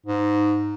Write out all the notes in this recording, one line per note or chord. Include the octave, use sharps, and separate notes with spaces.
G#2